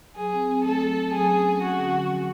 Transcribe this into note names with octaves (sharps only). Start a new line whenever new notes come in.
F#3 G#4
C4
C4
A3 A4
F#3
F#3
F#3 G#4
C#4
C#4
F#3 F#4
D3
C#4
F3